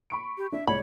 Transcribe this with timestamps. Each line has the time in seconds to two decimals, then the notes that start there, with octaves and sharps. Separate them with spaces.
0.10 B5 C#6 D7
0.38 G4
0.52 D4 E5
0.67 C2 G#3 C#5 D5 B5